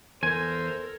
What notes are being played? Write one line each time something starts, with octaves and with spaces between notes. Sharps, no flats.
E2 A4 A#4 C5 G#5 G#6